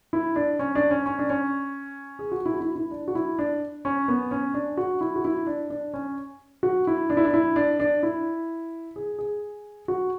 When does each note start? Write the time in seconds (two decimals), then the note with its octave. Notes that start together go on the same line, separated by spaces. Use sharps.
0.13 E4
0.36 D4
0.59 C#4
0.75 D4
0.91 C#4
1.06 C#4
1.19 D4
1.30 C#4
2.19 G#4
2.32 F#4
2.46 E4
2.53 F#4
2.61 E4
2.76 E4
2.91 D4
3.08 F#4
3.15 E4
3.39 D4
3.85 C#4
4.08 B3
4.31 C#4
4.54 D4
4.77 F#4
5.01 E4
5.16 F#4
5.25 E4
5.47 D4
5.70 D4
5.94 C#4
6.63 F#4
6.87 E4
7.10 D4
7.17 E4
7.25 D4
7.34 E4
7.56 D4
7.80 D4
8.03 E4
8.96 G#4
9.19 G#4
9.88 F#4